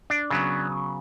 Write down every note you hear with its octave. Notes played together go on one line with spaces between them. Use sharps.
D4
C#3 F#3 B3